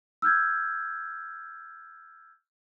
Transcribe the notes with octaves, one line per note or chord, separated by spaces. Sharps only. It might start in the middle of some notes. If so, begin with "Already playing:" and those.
E6 F6 G6 G#6